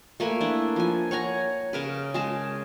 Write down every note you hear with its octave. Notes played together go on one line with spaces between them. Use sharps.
A3 A#3 B4 G#5
D4 E4
F3 G#5
C#5 F#5 G#5 A#5
C#3 A#4 B4
G#3 G#4 A5